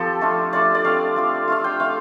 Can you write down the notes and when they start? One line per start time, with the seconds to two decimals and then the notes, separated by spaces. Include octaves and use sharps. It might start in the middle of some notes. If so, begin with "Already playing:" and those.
Already playing: F3 C4 G4 A4
0.21 A3 D4 F4
0.52 A3 D4 F4 D5
0.75 D5
0.84 A3 C4 F4 F5
1.16 A3 C4 F4
1.48 A3 D4 F4 F5
1.64 G5
1.80 A3 D4 F4 F5